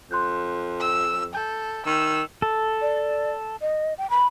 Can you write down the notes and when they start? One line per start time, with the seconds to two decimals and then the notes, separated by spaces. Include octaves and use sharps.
0.11 F2 C6 F#6 G6
0.81 E6
1.35 A4 G6
1.87 D#3 E6
2.42 A4
2.81 D5
3.61 D#5
3.98 G5
4.10 B5